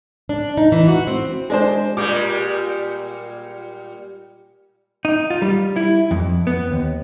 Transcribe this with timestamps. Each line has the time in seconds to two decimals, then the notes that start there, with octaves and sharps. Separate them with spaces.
0.29 D4
0.57 D#4
0.72 E3
0.88 F#4
1.07 C4
1.50 G#3 D4 C5
1.97 A#2 G3 G#3 D6
5.05 D#4
5.30 F4
5.42 G3
5.76 E4
6.11 F2
6.47 B3
6.71 D#2